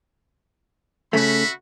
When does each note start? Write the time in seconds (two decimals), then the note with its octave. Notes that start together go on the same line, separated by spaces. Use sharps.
1.13 C#3 A3 F#4 E5 B5